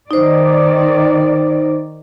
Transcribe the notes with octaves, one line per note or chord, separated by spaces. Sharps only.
D#3 D#4 C5 D5